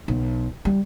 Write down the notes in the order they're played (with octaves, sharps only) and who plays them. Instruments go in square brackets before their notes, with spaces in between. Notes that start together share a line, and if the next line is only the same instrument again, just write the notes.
[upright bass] B1
G3